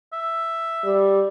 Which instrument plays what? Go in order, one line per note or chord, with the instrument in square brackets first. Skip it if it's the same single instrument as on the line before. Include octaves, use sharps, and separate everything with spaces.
[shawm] E5
[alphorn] G3